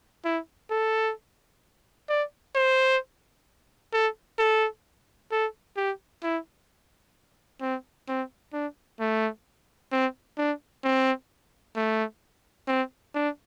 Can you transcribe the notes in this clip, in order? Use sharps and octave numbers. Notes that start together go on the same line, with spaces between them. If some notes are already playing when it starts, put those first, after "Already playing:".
E4
A4
D5
C5
A4
A4
A4
G4
E4
C4
C4
D4
A3
C4
D4
C4
A3
C4
D4